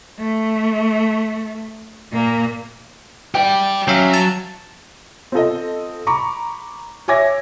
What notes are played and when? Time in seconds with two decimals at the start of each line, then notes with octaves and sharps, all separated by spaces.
0.19 A3
2.13 A#2 A#3
3.35 G4 D5 G5
3.88 F#3 C#4 E5 F5
4.14 A5
5.32 C4 F4 A4 D#5
6.07 A#5 B5 C#6 D6
7.08 C#5 E5 G#5 D6 G#6 A#6